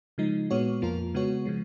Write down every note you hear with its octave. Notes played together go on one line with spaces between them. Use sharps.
C#3 F3 G#3 D#4
A#2 G#3 B3 F#4 C#5
F2 F3 A#3 F4 A#4
C#3 G#3 B3 F#4 C#5
C#3 F3 G#3